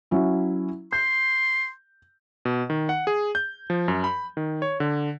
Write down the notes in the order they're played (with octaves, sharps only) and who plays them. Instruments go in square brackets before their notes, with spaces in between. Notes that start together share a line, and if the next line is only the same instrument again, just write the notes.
[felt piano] F#3 C#4 E4
[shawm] C6 [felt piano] G6
[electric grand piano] B2
D#3
F#5
G#4
G6
F3
F#2
B5
D#3
C#5
D3